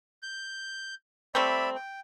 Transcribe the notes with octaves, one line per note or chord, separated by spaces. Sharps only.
G6
G3 A3 C4 D5 E5 B5
G5